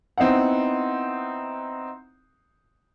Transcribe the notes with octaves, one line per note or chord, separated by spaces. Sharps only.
B3 C4 D#4 E4 F#5